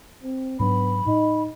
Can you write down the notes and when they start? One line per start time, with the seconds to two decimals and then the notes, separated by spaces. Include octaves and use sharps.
0.23 C4
0.59 G#2 F#3 B3 D4 B5
1.06 A2 D#4